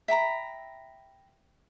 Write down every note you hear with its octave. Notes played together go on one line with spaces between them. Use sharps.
E5 G5 A#5 B5